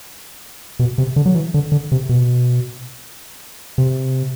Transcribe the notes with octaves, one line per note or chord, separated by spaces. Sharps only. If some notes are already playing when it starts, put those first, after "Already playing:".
B2
C3
D3
F#3
E3
D3
D3
C3
B2
C3